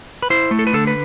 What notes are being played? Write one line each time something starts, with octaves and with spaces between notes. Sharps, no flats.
B4
E4 C5
A3
A4
B4
D3 A4
B4